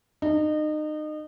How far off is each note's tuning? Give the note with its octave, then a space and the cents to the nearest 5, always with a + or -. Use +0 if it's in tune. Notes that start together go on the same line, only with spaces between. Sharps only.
D#4 -30